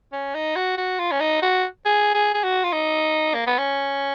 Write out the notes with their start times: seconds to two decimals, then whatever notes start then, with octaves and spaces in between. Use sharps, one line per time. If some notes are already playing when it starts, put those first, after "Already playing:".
0.12 C#4
0.34 D#4
0.56 F#4
0.77 F#4
0.99 F4
1.11 C#4
1.20 D#4
1.42 F#4
1.85 G#4
2.14 G#4
2.34 G#4
2.43 F#4
2.64 F4
2.72 D#4
3.34 A#3
3.46 B3
3.58 C#4